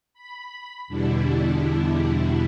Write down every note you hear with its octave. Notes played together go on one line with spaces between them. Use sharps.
B5
E2 B2 D3 G3 D4 E4